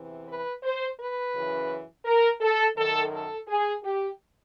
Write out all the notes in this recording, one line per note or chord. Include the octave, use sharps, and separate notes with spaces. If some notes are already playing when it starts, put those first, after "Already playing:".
Already playing: E2 C3 E3
B4
C5
B4
F#2 C#3 E3
A#4
A4
F#2 D#3 A4
A4
G#4
G4